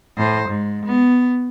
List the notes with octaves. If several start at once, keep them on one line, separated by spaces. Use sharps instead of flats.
A2 C5
G#2
B3